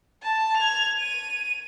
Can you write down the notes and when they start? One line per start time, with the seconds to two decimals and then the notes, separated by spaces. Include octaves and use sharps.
0.23 A5
0.57 G#6 F7
0.99 D#7